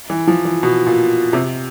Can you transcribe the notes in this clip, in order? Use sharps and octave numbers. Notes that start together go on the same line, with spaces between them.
E3
F3
E3
B2
A#2
C3